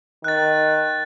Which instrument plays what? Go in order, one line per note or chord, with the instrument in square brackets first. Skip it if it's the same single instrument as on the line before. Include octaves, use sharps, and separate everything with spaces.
[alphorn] D#3 [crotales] F#6 A6